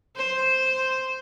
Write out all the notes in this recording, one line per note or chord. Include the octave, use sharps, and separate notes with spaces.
C5